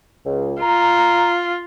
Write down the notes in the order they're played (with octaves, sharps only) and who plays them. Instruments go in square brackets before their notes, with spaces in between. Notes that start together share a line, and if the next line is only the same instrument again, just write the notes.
[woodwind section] C#2
[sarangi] F4 [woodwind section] A#5